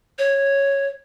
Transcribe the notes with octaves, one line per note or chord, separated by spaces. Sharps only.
C#5